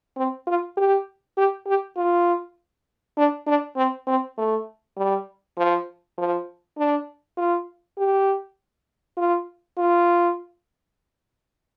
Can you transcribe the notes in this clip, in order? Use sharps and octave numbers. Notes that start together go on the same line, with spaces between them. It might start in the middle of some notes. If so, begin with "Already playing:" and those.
C4
F4
G4
G4
G4
F4
D4
D4
C4
C4
A3
G3
F3
F3
D4
F4
G4
F4
F4